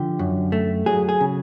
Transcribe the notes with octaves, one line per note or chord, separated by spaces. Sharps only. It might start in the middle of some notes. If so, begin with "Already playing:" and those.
Already playing: D3 F3 G4
F#2
A3
F#3 G#4
G#4
C#3